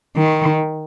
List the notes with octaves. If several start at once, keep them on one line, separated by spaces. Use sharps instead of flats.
D#3